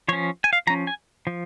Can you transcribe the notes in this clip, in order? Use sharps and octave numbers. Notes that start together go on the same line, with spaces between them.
F3 C#4 C#5
G#5
F5
F3 C#4 A#5
G#5
F3